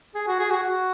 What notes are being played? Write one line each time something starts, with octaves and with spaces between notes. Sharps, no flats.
G#4
F#4
G#4
F#4
F#4